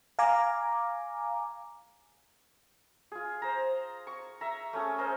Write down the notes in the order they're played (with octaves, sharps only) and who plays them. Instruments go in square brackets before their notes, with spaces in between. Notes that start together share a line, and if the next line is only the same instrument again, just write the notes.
[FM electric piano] F5 G#5 A#5 D6
[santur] F4 G#4
C5 A#5
C#6
E5 A#5
A3 C#4 G#4
G#4 A#4 C5 D#5